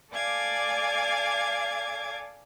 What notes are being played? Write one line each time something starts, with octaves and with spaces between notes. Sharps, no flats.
A4 D5 F5 G#5 D6 G#6